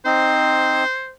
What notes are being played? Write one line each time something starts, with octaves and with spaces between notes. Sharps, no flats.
C4 D#4 C5